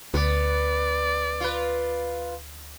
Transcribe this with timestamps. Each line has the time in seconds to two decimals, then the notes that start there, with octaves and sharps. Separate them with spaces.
0.14 D2 B3 D5
1.41 F4 B4